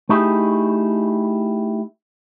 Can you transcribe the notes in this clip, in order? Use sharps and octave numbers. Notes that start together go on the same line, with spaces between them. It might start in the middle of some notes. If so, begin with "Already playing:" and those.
A3 D#4 E4 G4 G#4